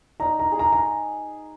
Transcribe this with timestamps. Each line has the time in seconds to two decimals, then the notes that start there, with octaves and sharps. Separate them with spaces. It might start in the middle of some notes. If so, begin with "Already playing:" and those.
0.20 D#4 A#5
0.39 A#5
0.52 G#4
0.59 A#5
0.73 A#5